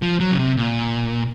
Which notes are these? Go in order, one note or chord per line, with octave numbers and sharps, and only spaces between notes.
F3
F#3
C#3
C3
A#2